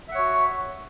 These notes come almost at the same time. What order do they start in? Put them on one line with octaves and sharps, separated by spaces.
E5 F#5 C#5 F#4